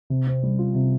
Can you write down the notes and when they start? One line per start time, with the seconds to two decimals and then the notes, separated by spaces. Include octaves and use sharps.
0.10 C3
0.27 C4
0.43 G3
0.59 F4
0.75 C3